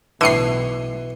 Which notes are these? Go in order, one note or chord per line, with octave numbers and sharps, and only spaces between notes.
B1 A2 D3 E3 C7 C#7 D#7